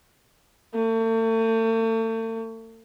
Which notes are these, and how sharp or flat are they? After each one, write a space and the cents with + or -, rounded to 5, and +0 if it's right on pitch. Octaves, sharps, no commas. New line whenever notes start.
A3 +40